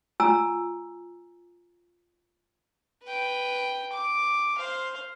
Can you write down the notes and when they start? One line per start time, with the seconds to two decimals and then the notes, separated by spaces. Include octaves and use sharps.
0.20 F4 G#5 A#5 E6
3.04 B4 G5
3.92 D6
4.58 C5 F5